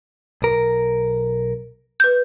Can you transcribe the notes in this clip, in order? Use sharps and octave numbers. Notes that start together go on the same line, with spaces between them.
B1 A#4
B4 G6